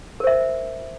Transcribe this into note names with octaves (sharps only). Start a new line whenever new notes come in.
A#4 C5 E5